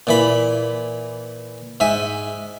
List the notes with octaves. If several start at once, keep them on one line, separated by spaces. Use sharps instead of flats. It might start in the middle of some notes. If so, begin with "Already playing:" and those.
A#2 E3 B5
G#2 E5 G#5